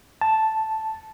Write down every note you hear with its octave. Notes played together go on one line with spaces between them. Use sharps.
A5